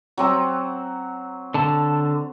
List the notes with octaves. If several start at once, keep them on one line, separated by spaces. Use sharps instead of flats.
F#3 C4 A#5
D3 A5